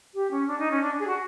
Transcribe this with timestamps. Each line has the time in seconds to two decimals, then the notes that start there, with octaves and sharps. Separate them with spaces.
0.14 G4
0.30 C#4
0.47 D4
0.58 D#4
0.71 C#4
0.81 D4
0.99 G#4
1.07 F#4